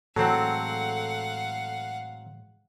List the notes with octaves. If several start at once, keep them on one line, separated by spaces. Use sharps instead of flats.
A2 E3 F#3 G#3 C4 A4 F5 F#5